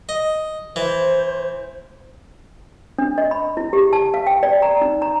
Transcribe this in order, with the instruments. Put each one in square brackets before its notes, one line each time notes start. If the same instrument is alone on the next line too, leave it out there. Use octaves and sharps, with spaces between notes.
[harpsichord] D#5
[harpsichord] E3 [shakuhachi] C5
[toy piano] D4
D#5
B5
E4
G4
A5
F5
G5
D5
A#5
D#4
A#5